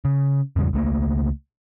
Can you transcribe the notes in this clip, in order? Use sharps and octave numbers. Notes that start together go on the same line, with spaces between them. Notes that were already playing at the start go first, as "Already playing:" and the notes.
C#3
E2 G#2 C#3 G3
C#2 A3 A#3